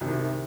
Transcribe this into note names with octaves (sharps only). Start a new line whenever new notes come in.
C2 C3 D#3